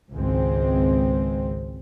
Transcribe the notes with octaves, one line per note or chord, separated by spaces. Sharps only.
G#1 C#2 G#3 C4